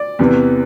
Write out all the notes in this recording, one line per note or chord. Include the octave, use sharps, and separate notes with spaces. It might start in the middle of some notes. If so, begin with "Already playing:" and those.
Already playing: D5
E2 C3 E3